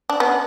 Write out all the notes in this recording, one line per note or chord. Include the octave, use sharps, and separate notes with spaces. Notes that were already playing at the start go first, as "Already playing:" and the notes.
D4
B3 C#4